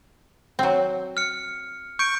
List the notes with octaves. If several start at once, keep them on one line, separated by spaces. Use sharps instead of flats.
F#3 C4
F6 C#7
C#6 G6 D7